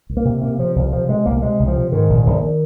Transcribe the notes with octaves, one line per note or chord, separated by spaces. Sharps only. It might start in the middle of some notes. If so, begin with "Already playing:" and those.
C2
A#3
C3
C3 A#3
C3 F3
C2 F3
C3 F3
C3 G#3
C2 A#3
A#3
C3 G#3
C2
F3
C3
G#2 D#3
A#1
A#1